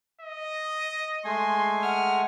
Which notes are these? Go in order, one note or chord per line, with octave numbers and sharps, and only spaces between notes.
D#5
G#3 A3 G#5 C6
F#5 F6